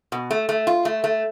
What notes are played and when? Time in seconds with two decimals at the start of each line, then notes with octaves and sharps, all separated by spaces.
0.12 B2
0.31 A3
0.49 A3
0.67 F4
0.85 A3
1.04 A3